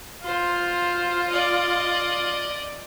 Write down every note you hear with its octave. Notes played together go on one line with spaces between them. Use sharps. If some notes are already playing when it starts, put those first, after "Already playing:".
F4 C5
D5 D#5